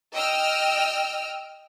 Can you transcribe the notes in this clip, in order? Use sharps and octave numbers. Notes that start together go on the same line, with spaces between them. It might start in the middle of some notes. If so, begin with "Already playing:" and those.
D#5 G5 E6 F6